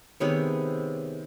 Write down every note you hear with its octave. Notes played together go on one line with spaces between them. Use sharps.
C3 D#3 G#3 B3 C#5